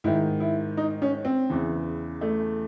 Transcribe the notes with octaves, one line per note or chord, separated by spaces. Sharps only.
G#2 D#3 E4
E4
D#4
C#4
C4
E2 C#3 E3
A3